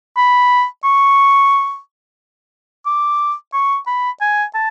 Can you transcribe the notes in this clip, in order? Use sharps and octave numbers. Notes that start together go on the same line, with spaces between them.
B5
C#6
D6
C#6
B5
G#5
A5